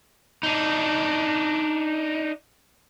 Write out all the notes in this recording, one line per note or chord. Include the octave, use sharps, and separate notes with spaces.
D4 D#4